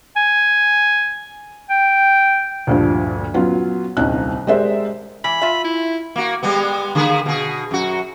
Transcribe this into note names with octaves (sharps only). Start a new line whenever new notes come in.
G#5
G5
D2 G2 A#2 D3 F3
F#3 B3 C#4 F4
D#1 C2 C#4 D#4 F#6
G#3 G4 A#4 C5 D5 E5
E3 B5
F4 E5
E4
A#3 F#4
G3 G#3 B3
D3 A#3 G#4
B2 G#4
F#2 F#4